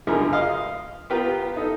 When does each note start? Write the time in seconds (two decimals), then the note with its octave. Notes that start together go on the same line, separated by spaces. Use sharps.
0.07 C#2 F#2 D3 G#4 A#4 F6
0.33 D#5 F5
1.10 B3 F4 G4 A#4 B4
1.56 D#4 A4